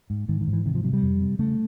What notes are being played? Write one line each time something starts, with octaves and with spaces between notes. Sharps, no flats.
G#2
G#2 D#3
D#3
G#2
E3
C3 D#3
F3
C3 F#3
G3
F2
C3
C#3 A3